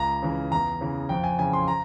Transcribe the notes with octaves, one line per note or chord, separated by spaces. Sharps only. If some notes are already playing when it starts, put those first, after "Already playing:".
Already playing: C#2 A#5
C#3 E3
E2 A#5
C#3 E3
F2 G5
G#5
C#3 E3 G#5
C6
A#5